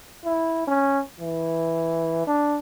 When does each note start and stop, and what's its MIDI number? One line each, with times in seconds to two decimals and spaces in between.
0.24 0.63 64
0.67 0.99 61
1.20 2.24 52
2.27 2.58 62